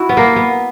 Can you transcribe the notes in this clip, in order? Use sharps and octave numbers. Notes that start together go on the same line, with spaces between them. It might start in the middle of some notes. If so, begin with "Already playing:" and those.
Already playing: E4 F#4
B3
A#3
B3